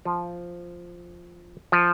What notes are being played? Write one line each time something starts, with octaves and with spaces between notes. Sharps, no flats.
F3
F3